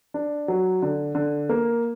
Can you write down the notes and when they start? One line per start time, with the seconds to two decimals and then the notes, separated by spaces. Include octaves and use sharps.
0.14 D4
0.48 F#3
0.82 D3
1.15 D3
1.49 A#3